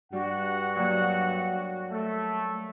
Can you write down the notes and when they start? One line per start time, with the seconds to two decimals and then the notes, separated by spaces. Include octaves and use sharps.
0.13 G2 G3 F#4 F#5
0.76 F#3 G3 A#3
1.91 A3